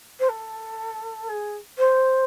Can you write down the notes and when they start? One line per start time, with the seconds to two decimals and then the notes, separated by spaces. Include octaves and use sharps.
0.19 C5
0.29 A4
1.28 G#4
1.78 C5